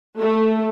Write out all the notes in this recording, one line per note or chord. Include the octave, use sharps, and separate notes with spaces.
A3